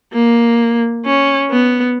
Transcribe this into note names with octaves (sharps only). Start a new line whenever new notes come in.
A#3
C#4
B3